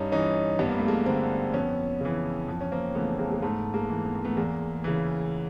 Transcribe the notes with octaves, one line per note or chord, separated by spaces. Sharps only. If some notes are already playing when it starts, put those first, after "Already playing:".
Already playing: G2 C#4 D#4
E3 C#4 D#4
G2 B3
A#3
A3
G#3 A#3
D3 A#3 C4
F2 B3 C#4
C#3 E3
F2
C#4
A#3 C4
C#3 E3 A3 B3
G#3 A#3
G#3
G#2 A3
G#3 A#3
E3
B3
A#3
A3 B3
E2 G#3 A#3
C#3 E3